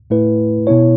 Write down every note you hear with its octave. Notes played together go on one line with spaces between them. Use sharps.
A2 A3 E4 B4
B2 B3 E4 C#5